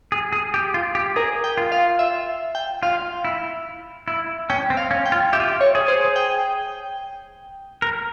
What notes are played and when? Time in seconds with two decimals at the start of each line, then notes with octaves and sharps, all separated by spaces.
0.12 G#4
0.33 G#4
0.54 G4
0.74 F4
0.95 G4
1.16 G#4 A#4
1.44 G5
1.57 F4
1.72 F5
1.99 E5
2.55 G5
2.83 F4 F5
3.25 E4
4.08 E4
4.50 C#4 G5
4.70 C4
4.77 F5
4.91 C#4
5.06 G5
5.12 F4
5.33 G4 E5
5.40 F4
5.48 G4
5.61 C#5
5.75 G#4
5.88 C5
6.16 G5
7.82 A#4